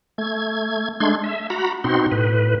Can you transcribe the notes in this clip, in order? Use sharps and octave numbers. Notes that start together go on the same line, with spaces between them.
A3 G#6
G#3 A3 D4 C6 G#6
E5
F#4 A#5 B5
B2 C4 D#4 F#4 C6
A2 B4